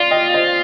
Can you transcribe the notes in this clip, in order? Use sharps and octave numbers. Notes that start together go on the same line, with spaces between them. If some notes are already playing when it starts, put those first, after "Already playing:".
Already playing: F4 D5 F5
D#5 G5
C5 D#5